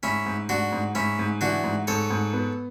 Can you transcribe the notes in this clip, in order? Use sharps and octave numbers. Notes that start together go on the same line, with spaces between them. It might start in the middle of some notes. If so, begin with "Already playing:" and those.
G#2 C#4 E4
G#2
G#2 D4 F#4
G#2
G#2 C#4 E4
G#2
E3 D4 F#4
G#2
G#2 A4 C#5
G#2
B3